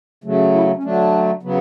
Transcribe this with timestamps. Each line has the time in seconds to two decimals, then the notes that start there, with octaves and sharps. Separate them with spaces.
0.24 C#3 F#3 A3
0.54 E4
0.76 C#4
0.83 D3 F#3 A3 D4
1.43 C#3 F#3 B3